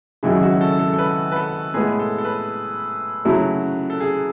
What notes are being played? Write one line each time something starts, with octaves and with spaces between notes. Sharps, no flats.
G#1 F#2 C#3 E4
F#4
A4
A4
A4
B4
B4
A4
A2 G#3 B3 G#4
A4
A4
B4
F#2 C#3 F#3 A3 E4
A4
G#4